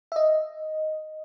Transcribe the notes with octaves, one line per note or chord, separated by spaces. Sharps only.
E5
D#5